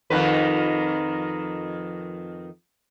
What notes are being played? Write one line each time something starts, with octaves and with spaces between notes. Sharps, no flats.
F2 D#3 B4